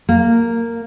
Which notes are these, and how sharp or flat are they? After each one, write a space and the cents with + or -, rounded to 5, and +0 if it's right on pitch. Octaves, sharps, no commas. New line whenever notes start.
A#3 -10